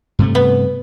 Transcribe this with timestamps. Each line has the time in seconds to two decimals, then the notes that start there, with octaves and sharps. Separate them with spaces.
0.19 G2 C3 A3
0.35 B3